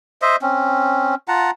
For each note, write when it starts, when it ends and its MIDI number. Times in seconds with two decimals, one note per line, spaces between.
0.22 0.36 72
0.22 0.36 75
0.22 0.36 76
0.42 1.15 60
0.42 1.15 61
1.28 1.51 65
1.28 1.51 78
1.28 1.51 81
1.28 1.51 82